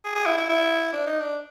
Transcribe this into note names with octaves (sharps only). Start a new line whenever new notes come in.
G#4
G#4
E4
E4
E4
D4
D#4
D4